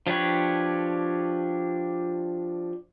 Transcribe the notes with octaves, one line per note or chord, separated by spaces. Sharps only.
F3 D4 G4 B4 C#5